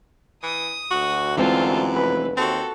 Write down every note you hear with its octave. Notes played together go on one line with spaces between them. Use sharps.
E3 D#6
D2 F#4
F#2 E3 G#3 C4 F4 A5
F1 B4
D#2 C4 F#4 A4